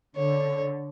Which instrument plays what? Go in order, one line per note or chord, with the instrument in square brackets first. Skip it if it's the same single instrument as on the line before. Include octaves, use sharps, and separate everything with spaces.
[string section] D3 [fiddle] C#5